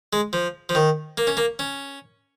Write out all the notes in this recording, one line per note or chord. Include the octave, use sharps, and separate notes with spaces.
G#3
F3
F3
D#3
A#3
C#4
A#3
C#4